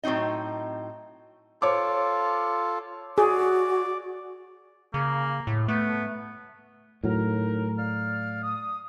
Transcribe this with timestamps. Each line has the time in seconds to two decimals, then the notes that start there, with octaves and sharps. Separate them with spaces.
0.03 A2 F#3 C4 D#4 D#5
1.62 F4 A4 C5 C#5 D6
3.18 F#4 G#4 D5
4.94 C#3 A#3
5.47 A2
5.68 A3 B3
7.04 A2 F#3 D#4 A#4
7.77 D5 F5 F6
8.42 D#6